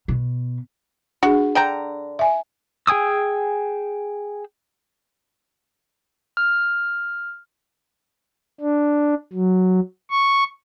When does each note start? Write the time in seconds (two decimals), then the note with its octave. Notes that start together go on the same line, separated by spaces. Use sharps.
0.08 B2
1.23 D4 F#4 G#4
1.55 D3 G5 A#5
2.19 E5 G#5
2.87 G#4 G5 G#5 D#6 E6
6.37 F6
8.61 D4
9.33 F#3
10.10 C#6